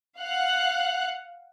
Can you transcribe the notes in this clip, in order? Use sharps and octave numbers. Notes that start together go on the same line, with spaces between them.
F5 F#5 F#6